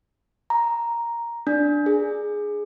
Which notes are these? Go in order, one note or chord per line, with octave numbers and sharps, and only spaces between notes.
A#5
D4
G#4